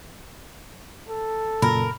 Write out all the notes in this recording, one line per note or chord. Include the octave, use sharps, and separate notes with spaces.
A4
F#2 A#2 C#3 A#4 B5